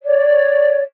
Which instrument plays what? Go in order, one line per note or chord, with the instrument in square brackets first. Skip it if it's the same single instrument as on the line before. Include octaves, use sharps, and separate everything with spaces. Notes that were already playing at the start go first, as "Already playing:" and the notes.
[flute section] C#5 D5